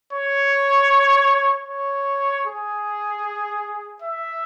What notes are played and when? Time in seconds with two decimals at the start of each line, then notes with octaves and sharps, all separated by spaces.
0.13 C#5
1.69 C#5
2.46 G#4
4.02 E5